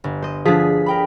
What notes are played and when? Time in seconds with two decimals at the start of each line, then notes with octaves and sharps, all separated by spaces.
0.04 G1
0.22 C5 D#5
0.45 D3 F3 G#4 B6
0.86 A#4 G5 B5